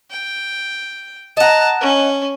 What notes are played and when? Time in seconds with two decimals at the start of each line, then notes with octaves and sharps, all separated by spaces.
0.11 G5
1.37 D#5 F#5 A5 A#5
1.81 C#4